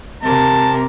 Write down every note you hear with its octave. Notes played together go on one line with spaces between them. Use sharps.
C3 A#4 A5